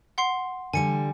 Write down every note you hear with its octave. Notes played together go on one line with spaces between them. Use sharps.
F#5 C6 C7
D3 G3 G#5 C#7